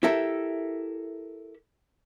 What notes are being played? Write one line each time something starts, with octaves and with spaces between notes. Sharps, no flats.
E4 G4 A4 A#4 E5